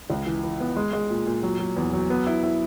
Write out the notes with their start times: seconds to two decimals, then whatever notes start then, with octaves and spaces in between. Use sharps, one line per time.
0.10 C#2
0.27 E3
0.43 E3
0.60 B3
0.77 G#3
0.93 G#3
1.10 A#2
1.26 A#2
1.43 F#3
1.59 F#3
1.77 E2
1.93 F#3
2.10 B3
2.27 E4
2.43 E4